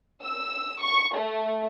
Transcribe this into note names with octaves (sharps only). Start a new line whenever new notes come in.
E6
C#6
A3